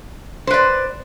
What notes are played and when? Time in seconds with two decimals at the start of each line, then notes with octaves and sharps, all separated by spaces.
0.47 C5
0.51 B4
0.54 D5